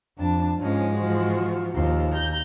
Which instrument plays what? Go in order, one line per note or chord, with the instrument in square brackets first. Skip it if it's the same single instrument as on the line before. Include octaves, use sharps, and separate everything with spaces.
[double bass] F2 [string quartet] D4 A5
[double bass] G#2 G#3 [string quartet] F3 C#4
[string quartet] E3 F3 F#4
[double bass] D#2 [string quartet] A#2 F3
[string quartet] A#5 G6